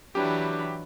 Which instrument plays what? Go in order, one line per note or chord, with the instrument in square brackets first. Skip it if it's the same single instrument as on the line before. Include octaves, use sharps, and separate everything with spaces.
[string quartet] E3 F#3 E4 [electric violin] D4 B4 [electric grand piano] G4